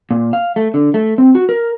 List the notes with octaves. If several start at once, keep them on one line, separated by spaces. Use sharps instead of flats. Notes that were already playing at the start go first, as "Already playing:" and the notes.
A#2
F5
A3
D3
A3
C4
F#4
A#4